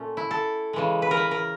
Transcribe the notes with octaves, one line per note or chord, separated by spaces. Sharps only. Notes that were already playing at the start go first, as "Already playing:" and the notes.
Already playing: A#2 A3 C#4
E4
A4
C#3 E3 G#3
B4
A#4
B4
A#4